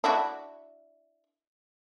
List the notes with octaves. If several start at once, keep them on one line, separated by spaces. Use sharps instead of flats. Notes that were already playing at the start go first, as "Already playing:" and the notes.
D4 E4 F#4